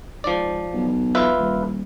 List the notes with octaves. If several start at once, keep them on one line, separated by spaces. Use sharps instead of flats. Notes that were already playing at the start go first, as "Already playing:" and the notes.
G#2 F3 D5
B1
F4 B4 E5
D#1